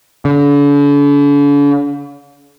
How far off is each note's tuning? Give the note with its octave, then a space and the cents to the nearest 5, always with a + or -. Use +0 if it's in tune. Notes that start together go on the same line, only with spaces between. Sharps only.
D3 -45